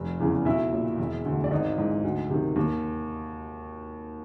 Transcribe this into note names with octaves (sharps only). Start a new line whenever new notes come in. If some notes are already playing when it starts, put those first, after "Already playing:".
Already playing: F1
E2 C#3 E3
B1 E4 E5
A#2
E1
D2 D3
D5
G#1 D#4 D#5
G#2 E3
D2
C3 D#3
D#2